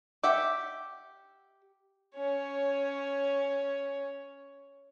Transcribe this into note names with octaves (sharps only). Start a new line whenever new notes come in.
G4 E5 F#5
C#4 C#5